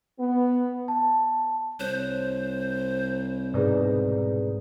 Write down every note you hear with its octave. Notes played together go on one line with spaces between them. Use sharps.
B3
A5
C2 C5 C#5 F#6 G6
G#2 B2 D#4 G#4 B4 D5